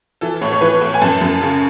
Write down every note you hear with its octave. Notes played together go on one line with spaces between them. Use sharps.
E3 A4
A2 C#5
C#5
E3 B4
A2
G#5
F#2 A5
F#2
C#3